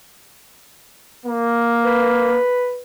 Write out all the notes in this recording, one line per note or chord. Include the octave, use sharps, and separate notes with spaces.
A#3
B4